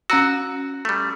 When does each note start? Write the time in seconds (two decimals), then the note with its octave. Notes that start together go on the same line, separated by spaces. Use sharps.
0.10 C#4 F#4 A#5 E6
0.85 G3 A3